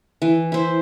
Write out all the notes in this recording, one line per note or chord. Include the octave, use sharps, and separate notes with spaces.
E3
E4 C5